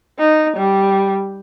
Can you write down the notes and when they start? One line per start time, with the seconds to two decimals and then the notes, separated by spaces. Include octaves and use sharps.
0.19 D#4
0.57 G3